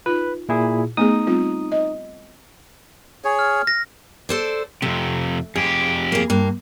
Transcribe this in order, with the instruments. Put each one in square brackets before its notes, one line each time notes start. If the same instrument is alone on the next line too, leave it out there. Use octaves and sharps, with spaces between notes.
[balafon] D#4 F4 [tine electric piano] B4
[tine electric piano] A#2 E4 G#4
[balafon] A3 B3 G#4 [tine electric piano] D#4 D#6
[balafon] G3 C4 F4
D#5
[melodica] G#4 C#5
[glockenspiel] F6
A#6
[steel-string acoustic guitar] A4 C5 D5
[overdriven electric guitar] F2 C3 [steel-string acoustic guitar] A3
[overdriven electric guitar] F2 G4 [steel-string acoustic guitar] G#4
[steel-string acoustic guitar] A#3 G#4
G2 A#3